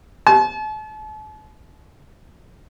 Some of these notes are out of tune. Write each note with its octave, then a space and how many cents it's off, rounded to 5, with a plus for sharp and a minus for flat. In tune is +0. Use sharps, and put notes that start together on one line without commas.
A5 -40